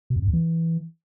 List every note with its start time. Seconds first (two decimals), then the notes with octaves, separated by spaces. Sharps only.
0.10 B2
0.16 F2
0.22 G2
0.28 E2
0.33 E3